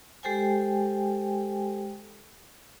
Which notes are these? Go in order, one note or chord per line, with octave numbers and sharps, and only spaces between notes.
G#3 G4 A4 C5 G5 G#5